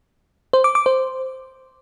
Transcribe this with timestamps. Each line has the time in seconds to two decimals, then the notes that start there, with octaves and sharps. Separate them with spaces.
0.53 C5
0.64 D6
0.75 D6
0.86 C5